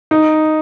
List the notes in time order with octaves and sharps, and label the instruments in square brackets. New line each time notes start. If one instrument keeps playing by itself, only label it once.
[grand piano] D#4